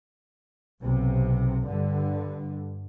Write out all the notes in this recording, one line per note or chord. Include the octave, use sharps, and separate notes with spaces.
B1 C3
G2 D3